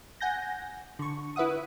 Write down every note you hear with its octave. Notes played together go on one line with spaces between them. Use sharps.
F#5 G#5 G6 A#6
D3 C#6
E4 B4 E5 F#5 D#6